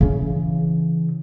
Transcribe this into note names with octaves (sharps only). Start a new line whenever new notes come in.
C#3 E3